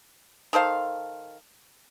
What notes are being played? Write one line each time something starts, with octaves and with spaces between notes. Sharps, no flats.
D#3 A4 C5 F5